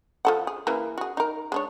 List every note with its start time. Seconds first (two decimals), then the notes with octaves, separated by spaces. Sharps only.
0.25 F3 A4 F#5
0.47 G#4
0.67 C#3 E3 A#3
0.98 F#4 G#4
1.17 D#4 A#4
1.52 G#3 D4 C#5